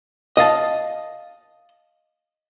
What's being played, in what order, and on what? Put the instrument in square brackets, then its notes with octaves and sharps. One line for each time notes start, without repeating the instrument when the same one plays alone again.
[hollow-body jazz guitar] D#5 F5 A5